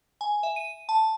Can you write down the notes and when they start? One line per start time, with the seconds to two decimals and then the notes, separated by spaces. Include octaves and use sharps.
0.21 G#5
0.43 E5
0.56 D#7
0.89 A5